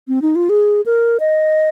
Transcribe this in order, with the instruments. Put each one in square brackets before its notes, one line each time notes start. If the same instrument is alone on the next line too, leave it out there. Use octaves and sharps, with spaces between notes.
[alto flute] C4
D#4
F4
G#4
A#4
D#5